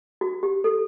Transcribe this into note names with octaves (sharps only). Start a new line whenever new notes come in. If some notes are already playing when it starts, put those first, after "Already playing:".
F#4
G4
A4